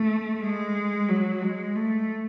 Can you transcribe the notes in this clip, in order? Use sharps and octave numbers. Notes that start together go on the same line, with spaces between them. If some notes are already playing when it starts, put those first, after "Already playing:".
Already playing: A3
G#3
F#3
G#3
A3